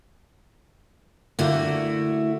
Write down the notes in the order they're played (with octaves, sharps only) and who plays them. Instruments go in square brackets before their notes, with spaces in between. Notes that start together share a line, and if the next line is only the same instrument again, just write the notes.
[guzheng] D3 A#3 G5 [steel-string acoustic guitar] A3 E4 F#4